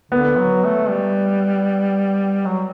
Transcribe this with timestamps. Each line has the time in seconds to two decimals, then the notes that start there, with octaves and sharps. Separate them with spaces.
0.12 D3 B3
0.38 F#3
0.64 A3
0.90 G3
2.46 F#3